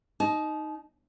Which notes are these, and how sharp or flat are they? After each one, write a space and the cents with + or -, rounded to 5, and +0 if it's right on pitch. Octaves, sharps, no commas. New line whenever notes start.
D#4 +0 A5 -35